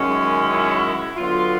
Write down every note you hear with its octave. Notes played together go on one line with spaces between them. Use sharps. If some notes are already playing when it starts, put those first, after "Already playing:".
Already playing: F#2 D#3 G#3 C#4
E4
D3 F#3 B3 F4